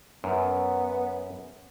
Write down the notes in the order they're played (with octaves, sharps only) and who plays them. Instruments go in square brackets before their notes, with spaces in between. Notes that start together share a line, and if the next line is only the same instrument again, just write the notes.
[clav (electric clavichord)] F#2 [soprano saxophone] B3